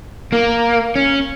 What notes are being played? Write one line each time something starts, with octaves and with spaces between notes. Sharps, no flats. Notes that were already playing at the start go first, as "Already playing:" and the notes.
A#3
C#4